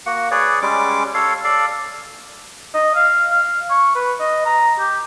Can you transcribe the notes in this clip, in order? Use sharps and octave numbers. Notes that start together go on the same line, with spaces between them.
A#3 F#4 F#5
G#4 B4 C#5 D5
G3 G#3 C#4 D6
A4 C#5 F5
A4 D5 F5
D#5
F5
F5
C#6
B4
D#5
A#5
G4